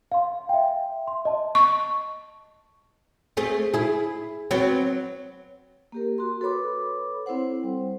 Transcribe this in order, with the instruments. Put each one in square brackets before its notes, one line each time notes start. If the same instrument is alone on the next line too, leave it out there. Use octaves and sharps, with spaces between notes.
[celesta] F5 C6
E5 G5
C6
D#5 A5
[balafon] C#6
[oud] A3 C4 G#4
E4 G#4
F#3 B3 C4
[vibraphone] A#3 G4 A#4
F#4 C6
A4 B4 C#5 B5 D6
C4 E4 A4 C5 F#5
G3